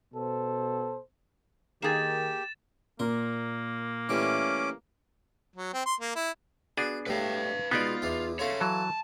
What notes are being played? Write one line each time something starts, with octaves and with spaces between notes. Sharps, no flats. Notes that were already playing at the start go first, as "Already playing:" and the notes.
B2 B3 A4 C5
D#3 A#3 G4 G#4 A6 E7
A#2 A#3 A#4 C6
E3 G3 A3 C#4 D6
F#3
C4
C6
A#3
E4
B3 D4 F#4 G#4
A2 G3 A3 B4 F5
B2 G#3 B3 D#4 F4 D5
E2 D4 E4
E4 F4 G#4 A4 C#5
E3 F#3 A5